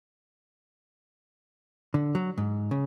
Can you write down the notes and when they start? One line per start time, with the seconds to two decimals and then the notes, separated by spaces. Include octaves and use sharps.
1.94 D3
2.15 F#3
2.38 G#2
2.71 C#3